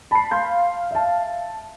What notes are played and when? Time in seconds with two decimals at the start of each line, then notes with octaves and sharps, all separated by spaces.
0.11 A5 B5 C7
0.31 F5 C6 G6
0.91 E5 A5